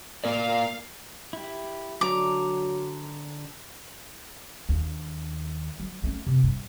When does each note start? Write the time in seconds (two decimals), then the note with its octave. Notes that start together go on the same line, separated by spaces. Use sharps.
0.24 A#3 A#4 D5 F5
1.33 E4 G4
2.01 D3 F#3 D4 A#5 D6
4.69 D#2 D4
5.80 F#3
6.04 A3 C#4
6.27 C3
6.44 G2